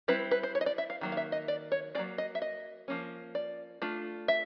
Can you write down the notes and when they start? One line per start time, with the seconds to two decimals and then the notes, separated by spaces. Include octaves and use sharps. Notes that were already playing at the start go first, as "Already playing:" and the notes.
0.08 G3 C4 E4 B4
0.31 B4
0.43 C5
0.55 C#5
0.61 D#5
0.66 D5
0.78 E5
0.90 F5
1.01 D#3 F#3 A#3
1.12 F5
1.17 E5
1.32 D#5
1.48 D5
1.72 C#5
1.95 F#3 A#3 C#4 F4 D5
2.18 D#5
2.35 E5
2.42 D#5
2.88 F3 A#3 C#4
3.35 D5
3.82 A3 D4 F4
4.28 E5